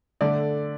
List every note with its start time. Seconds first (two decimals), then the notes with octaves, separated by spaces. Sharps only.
0.21 D3 A3 D5